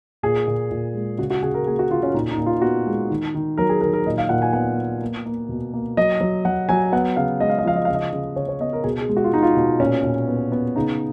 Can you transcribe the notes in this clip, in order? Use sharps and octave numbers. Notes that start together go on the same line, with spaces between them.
A#2 G#4
A#2
A#2
G#3
C#3 F#4
F#4
C#3 G#4
A#4
A#3 G#4
F#4
C#3 F4
C#4
A#2 D#4
D#4
A#2
F4
B3 F#4
G#3
D#3
D#3
F#3 A#4
G#4
D#3 A#4
A#4
A#2 D#5
F5
A#2 F#5
G#5
B3 F#5
B3
A#3
A#3
B2
A#3
F#3 D#5
F#3
F#3 F#5
F#3 G#5
B3 F#5
C#3 F5
G#3 D#5
F5
D#5
F3 F5
D#5
F5
C#3
D#5
C#3
C#3 C#5
C#5
B3 D#5
A#4
B2 G#4
G#4
G#3
F#4
F4
G#3 D#4
F4
B2
A#2 C#4
A#2
B3
B3
C#3 D#4